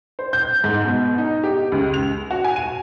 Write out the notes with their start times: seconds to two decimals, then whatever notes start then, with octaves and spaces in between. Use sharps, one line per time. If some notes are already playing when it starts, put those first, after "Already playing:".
0.19 C5
0.33 G6
0.64 G#2
0.85 B2
1.18 D#4
1.44 G4
1.72 C#2
1.94 F7
2.31 F#4
2.44 G#5
2.56 D#7